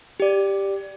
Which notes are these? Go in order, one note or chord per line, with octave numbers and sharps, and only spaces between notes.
G4 D5